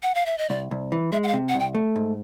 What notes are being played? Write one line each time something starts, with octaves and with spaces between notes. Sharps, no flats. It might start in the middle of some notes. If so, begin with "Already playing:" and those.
F#5
F5
E5
D#5
C2 D5
C2
E3
G#3 E5
F#5
F5
C3
F#5
C2 G5
A3
G#2